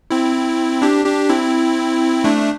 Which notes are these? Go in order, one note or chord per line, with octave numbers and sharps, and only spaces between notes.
C4 E4
D4 G4
D4 G4
C4 E4
A3 D4